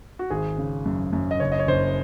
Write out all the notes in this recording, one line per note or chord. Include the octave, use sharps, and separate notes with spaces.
F#4
G#1 G#4
C#3
F#2
F#2
D#5
F#1 C#5
D#5
C#5
F#1 C5